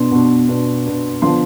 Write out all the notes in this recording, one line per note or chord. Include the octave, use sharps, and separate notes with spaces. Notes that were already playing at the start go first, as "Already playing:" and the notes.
Already playing: B2 B3 D4 C6
B2 B3 D4
B2 B3 D4
B2 B3 D4
D3 F3 B3 D4 C6